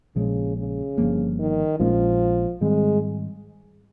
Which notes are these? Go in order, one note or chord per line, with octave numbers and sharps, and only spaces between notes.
A#1 A#2 C#3 F3 G#3
C#3
G1 G2 F3 A#3
D#3
A#1 A#2 F3 G#3 C#4
G#2 D#3 G3 G#3 C4